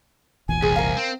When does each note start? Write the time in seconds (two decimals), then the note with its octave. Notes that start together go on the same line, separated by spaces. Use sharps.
0.48 E1 A#1 E3 G#5
0.62 C2 G#4
0.76 A#4 F5
0.97 C4